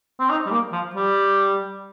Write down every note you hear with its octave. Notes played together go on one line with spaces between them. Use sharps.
C4
D#4
G3
A#3
F3
G3